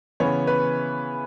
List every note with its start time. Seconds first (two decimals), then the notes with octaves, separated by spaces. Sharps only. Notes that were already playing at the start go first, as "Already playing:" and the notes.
0.20 C#3 E3 B3 C#5
0.47 B4